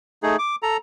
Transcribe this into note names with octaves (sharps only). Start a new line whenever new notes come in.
A3 D#4 G#4
D6
A4 A#5